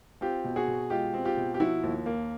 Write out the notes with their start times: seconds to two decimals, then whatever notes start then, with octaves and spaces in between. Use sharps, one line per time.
0.21 C4 F4 G4
0.44 B2
0.56 F#4 G#4
0.68 B2
0.90 G#3 F4 G4
1.14 C4
1.25 F4 G4
1.37 B2
1.54 G4
1.60 F3 E4 F#4
1.83 D#2
2.06 A#3